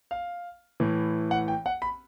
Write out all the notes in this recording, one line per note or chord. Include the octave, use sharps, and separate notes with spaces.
F5
A2 E3
F#5
G5
F#5
B5